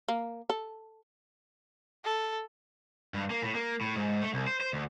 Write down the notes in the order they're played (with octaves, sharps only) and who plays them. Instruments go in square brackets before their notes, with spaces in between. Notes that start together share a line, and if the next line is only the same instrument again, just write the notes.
[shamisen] A#3
A4
[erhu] A4
[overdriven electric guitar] G2
A#3
A2
A#3
A2
G#2
A3
C2
C5
C5
D2